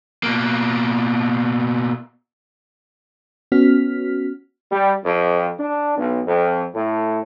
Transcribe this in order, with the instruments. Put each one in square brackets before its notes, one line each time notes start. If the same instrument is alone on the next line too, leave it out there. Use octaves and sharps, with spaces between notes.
[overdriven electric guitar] B2 A#3
[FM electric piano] B3 C#4 F#4 F6 B6
[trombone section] G3
F2
D4
B1
F2
A2